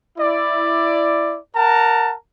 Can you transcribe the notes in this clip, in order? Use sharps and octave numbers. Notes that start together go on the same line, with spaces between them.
E4 D5
A#4 F#5 A5 A#5